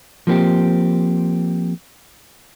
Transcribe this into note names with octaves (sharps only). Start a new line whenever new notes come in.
F3 A#3 C4 G4